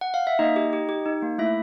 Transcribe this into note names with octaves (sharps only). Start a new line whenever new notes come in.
F#5
F5
E5
A#3 D#4 D#5
G4
G4
G4
D#4
A#3
A3 E4 E5